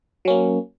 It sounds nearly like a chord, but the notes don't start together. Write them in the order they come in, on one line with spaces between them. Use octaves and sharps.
F#3 C#4 A#3